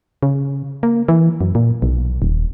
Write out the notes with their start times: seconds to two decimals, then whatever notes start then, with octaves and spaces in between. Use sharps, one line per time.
0.23 C#3
0.83 A#3
1.08 E3
1.41 F#2
1.55 A#2
1.82 B1
2.22 D#1